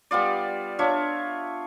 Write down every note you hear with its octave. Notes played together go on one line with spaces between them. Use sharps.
G3 B3 F4 D5
D4 F4 C#5 E5